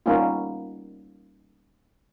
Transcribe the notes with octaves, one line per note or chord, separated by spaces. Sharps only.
G3 A#3 B3 C#4 D#4 F4